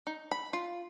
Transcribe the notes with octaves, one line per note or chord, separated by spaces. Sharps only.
D#4
B5
F4